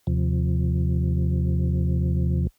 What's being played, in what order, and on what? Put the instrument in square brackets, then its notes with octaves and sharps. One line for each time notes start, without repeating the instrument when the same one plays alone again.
[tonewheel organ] D#2 C3 F3